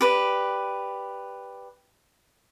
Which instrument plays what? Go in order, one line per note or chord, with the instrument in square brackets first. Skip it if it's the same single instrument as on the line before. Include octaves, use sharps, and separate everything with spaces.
[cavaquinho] G4 B4 D5